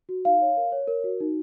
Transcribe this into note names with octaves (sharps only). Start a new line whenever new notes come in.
F#4
D#4 F5
C#5
A#4
C#5
A#4
F#4
D#4